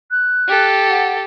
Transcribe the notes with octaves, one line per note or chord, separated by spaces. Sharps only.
F#6
G4 A4
F#5